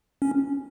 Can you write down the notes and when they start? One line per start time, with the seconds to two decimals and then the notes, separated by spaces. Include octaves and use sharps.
0.22 C#4